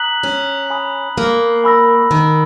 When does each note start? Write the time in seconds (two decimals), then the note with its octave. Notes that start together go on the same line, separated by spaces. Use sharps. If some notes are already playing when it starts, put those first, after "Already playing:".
Already playing: A#5 D#6 F#6 B6 F#7
0.23 C#4
0.70 G#5 B5 D#6
1.18 A#3
1.64 G#5 B5 E6 A#6
2.11 D#3